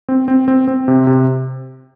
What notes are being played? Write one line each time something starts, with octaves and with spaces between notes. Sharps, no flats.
C4
C4
C4
C4
C3
C3